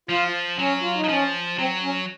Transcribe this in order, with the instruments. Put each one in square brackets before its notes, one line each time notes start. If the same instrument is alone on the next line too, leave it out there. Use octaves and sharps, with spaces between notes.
[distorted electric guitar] F3 [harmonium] F4
[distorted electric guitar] F#3 [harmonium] C#4
[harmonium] F4
D#4
[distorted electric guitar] F#3
[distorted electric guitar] F3 [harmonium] C#4
[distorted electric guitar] F#3 [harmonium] C4
[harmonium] C#4